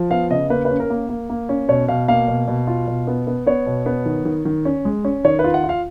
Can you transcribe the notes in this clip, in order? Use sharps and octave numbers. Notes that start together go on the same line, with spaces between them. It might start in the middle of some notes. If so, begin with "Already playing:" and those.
Already playing: F3
B3 F5
C#3 D#5
A#3 B4
B4
C#4
A#4
A#3
A#3
A#3
C#4
B2 C#5
B2 F5
A#3 F5
B2
B2
F4
B2
B3
B3
B3 C#5
B2
B3
D#3
D#3
D#3
C#4
G#3
C#4
D#3 C#5
B4
F4
F#5
F4
F5